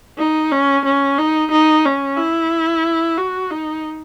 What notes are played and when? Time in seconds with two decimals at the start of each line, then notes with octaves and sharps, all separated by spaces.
0.18 D#4
0.52 C#4
0.85 C#4
1.18 D#4
1.51 D#4
1.85 C#4
2.17 E4
3.18 F#4
3.51 D#4